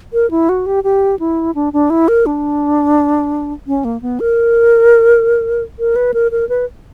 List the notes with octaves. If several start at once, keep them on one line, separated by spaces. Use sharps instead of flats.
A#4
E4
F#4
G4
G4
E4
D4
D4
E4
A#4
D4
C#4
A#3
B3
A#4
A#4
B4
A#4
A#4
B4